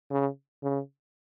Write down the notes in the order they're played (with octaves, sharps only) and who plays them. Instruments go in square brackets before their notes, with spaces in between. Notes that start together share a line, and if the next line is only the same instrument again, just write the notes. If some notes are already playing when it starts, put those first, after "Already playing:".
[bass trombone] C#3
C#3